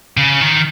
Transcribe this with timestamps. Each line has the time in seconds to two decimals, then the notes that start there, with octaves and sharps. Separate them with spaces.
0.17 C#3
0.41 D#3